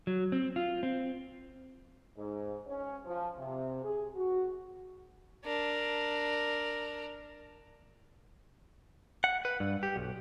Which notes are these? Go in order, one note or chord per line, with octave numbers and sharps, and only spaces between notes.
F#3
C4
F4
C4
G#2
C#4
F3
C3
G#4
F#4
D4 A#4
F#5
B4
G2
G4
B1